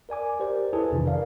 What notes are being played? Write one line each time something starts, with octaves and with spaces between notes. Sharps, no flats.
A#4 D5 G#5 D6
G4 A#4 C5 D5
E4 G#4 A4 B4 G#5 A5
G#1 F2 C3 D#3 E3 D4
A#4 D5 F5